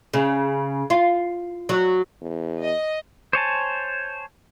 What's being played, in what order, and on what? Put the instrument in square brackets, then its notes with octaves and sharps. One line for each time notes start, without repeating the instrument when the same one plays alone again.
[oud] C#3
F4
F#3
[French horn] E2
[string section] D#5
[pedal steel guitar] C5 C#5 G#5 A5